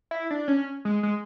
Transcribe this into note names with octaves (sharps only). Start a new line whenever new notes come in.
E4
D4
C#4
G#3
G#3